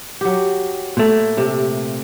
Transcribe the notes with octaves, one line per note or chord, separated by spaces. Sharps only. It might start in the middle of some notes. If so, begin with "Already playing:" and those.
F#3 G4
A#2 A3
C3